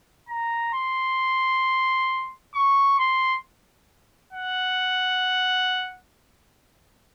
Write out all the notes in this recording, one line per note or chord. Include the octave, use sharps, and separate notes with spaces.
A#5
C6
C#6
C6
F#5